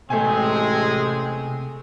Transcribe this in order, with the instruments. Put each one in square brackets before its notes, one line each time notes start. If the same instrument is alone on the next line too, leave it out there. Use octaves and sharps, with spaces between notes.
[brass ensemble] A1 G#3 G#4 [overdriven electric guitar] C3 [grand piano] A3 G#5 [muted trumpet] C4